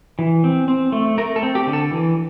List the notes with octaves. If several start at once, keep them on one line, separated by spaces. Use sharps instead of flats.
E3
C4
C4
A3
A3 A#4
A4
C4
G4
D3
A4
E3